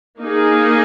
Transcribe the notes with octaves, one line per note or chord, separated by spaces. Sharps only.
A#3 D#4 G#4